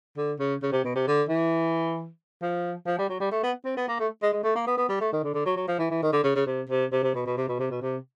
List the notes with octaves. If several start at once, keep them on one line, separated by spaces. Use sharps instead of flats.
D3
C#3
C#3
C3
B2
C3
D3
E3
F3
F3
G3
F#3
G3
A3
B3
C4
B3
A#3
A3
G#3
G#3
A3
A#3
B3
B3
G3
A3
D#3
D3
D3
F#3
F#3
F3
E3
E3
D#3
D3
C#3
C#3
C3
C3
C3
C3
B2
B2
C3
B2
C3
B2
C3